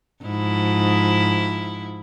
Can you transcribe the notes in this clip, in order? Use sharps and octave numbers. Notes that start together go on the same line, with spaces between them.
G#2 F3 E4